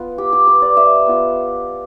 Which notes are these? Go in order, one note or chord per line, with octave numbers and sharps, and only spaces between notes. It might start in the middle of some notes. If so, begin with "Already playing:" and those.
Already playing: B3 F4 B4
G4
G4
B4
D5
E5
B3 F4